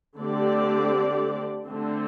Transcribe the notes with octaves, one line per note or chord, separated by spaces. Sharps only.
D3 A3 C4 G4 D5
D3 A3 C4